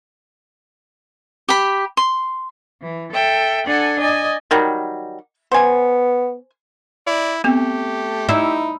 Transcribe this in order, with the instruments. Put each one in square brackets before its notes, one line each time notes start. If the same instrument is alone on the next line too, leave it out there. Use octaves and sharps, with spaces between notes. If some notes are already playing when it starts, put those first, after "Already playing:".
[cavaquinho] G4 B5
C6
[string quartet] E3
A4 E5 G5
D4 A4 F#5 G#5
D5 D#5 G#5
[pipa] D#3 F#3 G3
[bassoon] B3 [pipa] C5 G#5
[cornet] E4 [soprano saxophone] D5
[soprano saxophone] A3 [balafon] B3 C4 [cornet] G4
[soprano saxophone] D#4 [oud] E4